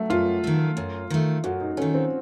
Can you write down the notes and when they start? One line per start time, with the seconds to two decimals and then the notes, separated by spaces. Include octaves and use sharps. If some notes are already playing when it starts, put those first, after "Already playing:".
Already playing: F#3 A3
0.10 F#2 F4
0.44 D#3 A3
0.77 F#2
1.10 D#3 A3
1.44 F#2 F#4
1.61 D#4
1.77 D#3 A3 C#4
1.94 C4